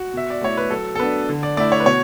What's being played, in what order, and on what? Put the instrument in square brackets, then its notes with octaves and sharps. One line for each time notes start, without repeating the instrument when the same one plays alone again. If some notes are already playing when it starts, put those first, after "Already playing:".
Already playing: [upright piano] F#4
B2 E5
D5
A3 E4 C#5
B4
F#3 A4
A4
B3 D4 B4
D3
D5
A3 E4 D5
C#5
B4
B2 C#5